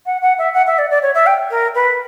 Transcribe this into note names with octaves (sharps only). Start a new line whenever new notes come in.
F#5
F#5
E5
F#5
E5
D5
D5
C#5
E5
G5
A#4
B4